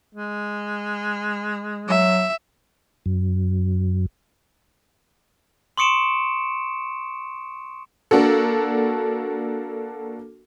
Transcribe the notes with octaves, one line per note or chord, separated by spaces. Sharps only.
G#3
F#3 E5
F#2
C6 C#6 D#6 C#7 D7 E7
A#3 D4 F#4 A4